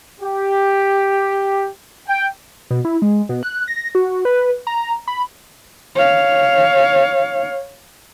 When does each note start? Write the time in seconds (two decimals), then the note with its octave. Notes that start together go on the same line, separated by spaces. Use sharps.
0.20 G4
2.08 G5
2.71 B2
2.85 E4
3.02 G#3
3.29 B2
3.43 F#6
3.68 A#6
3.95 F#4
4.25 B4
4.67 A#5
5.08 B5
5.95 C#5 F5